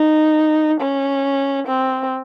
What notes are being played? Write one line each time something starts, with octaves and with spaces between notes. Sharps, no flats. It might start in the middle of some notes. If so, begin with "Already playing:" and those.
Already playing: D#4
C#4
C4